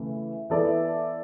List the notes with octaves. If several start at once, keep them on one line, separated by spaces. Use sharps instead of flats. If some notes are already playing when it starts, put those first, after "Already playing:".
Already playing: C#3 E3 A3
E3 B3 E4 A4 D5